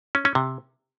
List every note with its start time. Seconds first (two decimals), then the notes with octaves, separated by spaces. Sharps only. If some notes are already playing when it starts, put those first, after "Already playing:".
0.15 C#4
0.25 C#4
0.35 C3